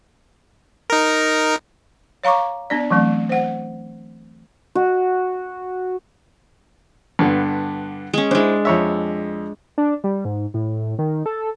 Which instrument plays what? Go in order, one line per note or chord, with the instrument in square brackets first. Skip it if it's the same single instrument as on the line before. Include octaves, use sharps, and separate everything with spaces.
[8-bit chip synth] D#4 A#4
[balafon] C#5 F5 A#5 C#6 D6
B3 D4 D5
E3 F#3 A3 C4
C5 F#5
[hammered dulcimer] F#4
[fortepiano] G2 D3 B3
[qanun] G#3 C#4
[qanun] G#3 D4 [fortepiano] E4 C5
[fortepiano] F2 C#5 E5
[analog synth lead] D4
G3
G#2
A2
D#3
A4